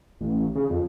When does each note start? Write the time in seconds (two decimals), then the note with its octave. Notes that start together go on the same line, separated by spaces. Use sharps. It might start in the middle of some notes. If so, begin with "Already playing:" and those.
0.21 A1
0.55 C#3
0.70 F2